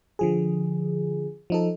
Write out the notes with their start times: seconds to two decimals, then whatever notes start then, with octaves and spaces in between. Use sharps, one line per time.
0.19 D3 F3 G#4
1.50 F3 D#4 A4